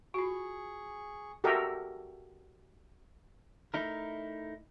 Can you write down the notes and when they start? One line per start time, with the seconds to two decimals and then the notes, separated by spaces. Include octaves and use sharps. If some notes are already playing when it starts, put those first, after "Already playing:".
0.14 F4 F#4 G#4 C#6
1.44 F#4 G4 A4 A#4 D#5 E5
3.74 A3 D#4 E4 A#4